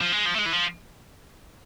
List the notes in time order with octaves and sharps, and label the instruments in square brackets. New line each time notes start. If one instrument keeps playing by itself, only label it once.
[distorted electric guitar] F3
G#3
F3
A3
G#3
E3
F3